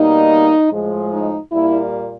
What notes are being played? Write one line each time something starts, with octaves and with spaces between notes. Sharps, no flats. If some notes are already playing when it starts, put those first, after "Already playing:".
Already playing: B2 G3 A#3 D#4
A2 F3 G#3
D#4
A#2 G3 A#3 E4